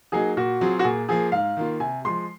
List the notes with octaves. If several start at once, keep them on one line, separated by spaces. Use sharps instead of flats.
F#3 A#3 D#4 F#4 G#4
A#2 F#4
F#3 C4 F4 G#4
F#4
A#2 G#4
F3 A#3 G#4
G#2 F5
D#3 A#3 F4
C3 G#5
F3 G#3 C6